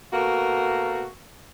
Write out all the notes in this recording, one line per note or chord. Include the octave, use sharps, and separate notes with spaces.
B2 A3 A#3 F#4